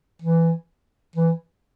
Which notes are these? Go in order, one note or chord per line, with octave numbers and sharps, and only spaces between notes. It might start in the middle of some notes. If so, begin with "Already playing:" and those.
E3
E3